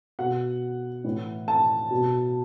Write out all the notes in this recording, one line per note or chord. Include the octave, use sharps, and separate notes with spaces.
B2 F#5
A2 E3
A5
B2